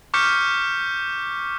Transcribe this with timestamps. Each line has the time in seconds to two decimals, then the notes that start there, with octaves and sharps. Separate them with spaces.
0.14 C#6 D6 F6 G6 B6 C#7